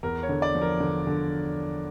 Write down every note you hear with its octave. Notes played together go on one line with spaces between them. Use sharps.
E2 A#4
C#5
D3
D5
F3
A#4
D3
D3